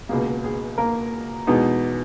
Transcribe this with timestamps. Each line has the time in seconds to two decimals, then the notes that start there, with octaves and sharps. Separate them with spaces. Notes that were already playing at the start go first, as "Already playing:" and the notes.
0.09 C#2 B2 A#3 G#4
0.44 G#4
0.78 A#3 A#4
1.47 E2 B2 G#3 B3 D#4